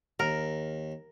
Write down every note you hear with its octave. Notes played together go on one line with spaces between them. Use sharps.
D#2 A#4